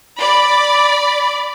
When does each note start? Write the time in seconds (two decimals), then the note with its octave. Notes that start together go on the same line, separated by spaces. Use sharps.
0.19 D5 B5